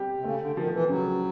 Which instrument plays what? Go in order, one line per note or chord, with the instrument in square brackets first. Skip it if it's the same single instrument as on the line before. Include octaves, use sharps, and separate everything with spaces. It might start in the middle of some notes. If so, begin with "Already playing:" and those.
Already playing: [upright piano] G3 C4 G4
[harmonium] C3
[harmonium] C#3 [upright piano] A3
[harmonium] D3
[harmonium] D#3 [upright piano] F3
[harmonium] E3
[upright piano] C#3 [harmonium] F#3